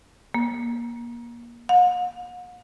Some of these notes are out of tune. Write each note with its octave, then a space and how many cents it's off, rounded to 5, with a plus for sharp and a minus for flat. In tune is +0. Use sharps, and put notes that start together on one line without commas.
A#3 +25
F#5 -45